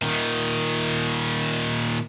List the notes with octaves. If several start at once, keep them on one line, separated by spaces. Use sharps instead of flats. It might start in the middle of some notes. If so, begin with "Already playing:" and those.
A#2 D#3